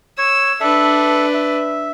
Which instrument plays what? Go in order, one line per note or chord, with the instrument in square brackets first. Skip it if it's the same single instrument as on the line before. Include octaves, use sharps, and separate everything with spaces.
[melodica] C#5 [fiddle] E6
[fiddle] D4 B4 [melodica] A4 E5
[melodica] E5